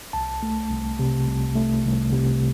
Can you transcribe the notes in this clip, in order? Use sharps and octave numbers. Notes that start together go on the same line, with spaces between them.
C2 A5
A3
C2
C3
C2
A3
C2
C3